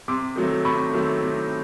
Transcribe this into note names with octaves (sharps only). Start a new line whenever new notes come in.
C3 C6 D6
D#3 F#3 A3 C4
C3 B5 C#6
D#3 F#3 A3 C4
C3